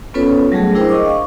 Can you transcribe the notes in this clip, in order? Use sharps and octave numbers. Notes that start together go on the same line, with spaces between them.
B3 C#4 F4 A4 B4 C#5
F#3 G3 A3 G#4
D4 E4 G#4 A#4 C5 G5
D#5 C#6 D6
F5 C#6